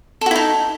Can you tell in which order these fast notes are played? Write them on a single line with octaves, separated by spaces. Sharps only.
A4 F#4 E4 D#4